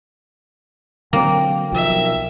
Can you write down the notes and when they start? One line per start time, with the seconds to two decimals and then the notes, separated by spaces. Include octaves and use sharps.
1.13 D3 F#3 A#3 C4 G5
1.72 B1 F3 A#4 E5